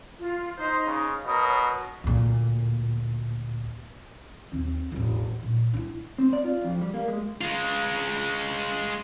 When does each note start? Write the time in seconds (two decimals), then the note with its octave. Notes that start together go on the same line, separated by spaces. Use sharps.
0.19 F4
0.58 D#4 C5 C6
0.86 C#3
1.26 B2 A#4 C#5 D#6
2.04 D2 A#2
4.52 D#2 C4
4.92 E1 A1
5.43 A#2
5.73 D4 E4
6.18 C4
6.33 D5
6.44 F4
6.64 F2
6.81 G3
6.94 A#3
7.08 G#3
7.41 G#3 F4